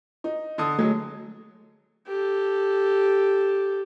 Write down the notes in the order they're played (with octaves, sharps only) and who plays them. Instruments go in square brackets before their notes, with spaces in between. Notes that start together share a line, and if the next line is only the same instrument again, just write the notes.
[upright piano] D#4
D3 A5 D#6
[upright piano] F#3 G#3 [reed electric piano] A3
[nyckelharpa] G4 A4